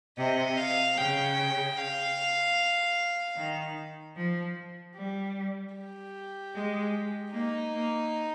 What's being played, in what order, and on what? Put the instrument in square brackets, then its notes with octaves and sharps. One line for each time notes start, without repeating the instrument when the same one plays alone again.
[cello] C3 [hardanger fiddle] D#5
[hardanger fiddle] F5
[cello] C#3 [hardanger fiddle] G5
[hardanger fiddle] F5
[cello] D#3
F3
G3
[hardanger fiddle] G4
[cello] G#3
[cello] A#3 [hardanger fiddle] D#4
[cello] A#3